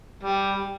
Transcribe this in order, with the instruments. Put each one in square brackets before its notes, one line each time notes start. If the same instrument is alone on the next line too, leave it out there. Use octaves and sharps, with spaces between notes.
[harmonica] G3